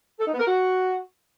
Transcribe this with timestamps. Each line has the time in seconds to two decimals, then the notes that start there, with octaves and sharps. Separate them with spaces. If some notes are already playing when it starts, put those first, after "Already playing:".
0.19 A4
0.26 D#4
0.33 B3
0.39 A#4
0.46 F#4